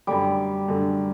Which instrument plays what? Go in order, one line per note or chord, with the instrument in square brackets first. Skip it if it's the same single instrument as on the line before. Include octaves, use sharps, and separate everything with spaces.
[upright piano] F#2 D3 A3 [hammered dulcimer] G3
[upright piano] F#2 D3 A3